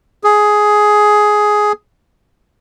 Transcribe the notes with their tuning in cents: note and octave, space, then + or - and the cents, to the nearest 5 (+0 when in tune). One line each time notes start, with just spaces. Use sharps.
G#4 +10